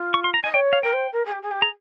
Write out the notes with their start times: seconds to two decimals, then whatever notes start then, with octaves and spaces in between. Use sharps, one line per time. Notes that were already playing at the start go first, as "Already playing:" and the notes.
Already playing: F4
0.14 C#6
0.24 C6
0.34 A#5
0.44 D#5 G#5
0.54 C#5 G5
0.73 F5
0.83 A#4 G5
0.93 C5
1.12 A#4
1.25 G#4
1.32 G4
1.42 G#4
1.51 G4
1.61 G#4 A#5